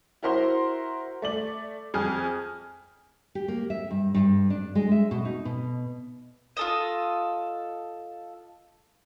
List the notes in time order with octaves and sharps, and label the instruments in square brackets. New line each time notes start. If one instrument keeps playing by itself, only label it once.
[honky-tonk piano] E4 F#4 A#4 C5 A#5 C6
A3 D5 F#7
F2 G#4 G#5 F6
[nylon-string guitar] G4
A#3
E5
G2
G2
D4
G#3
E5
B2
D#4
B2
[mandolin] F4 A4 D#5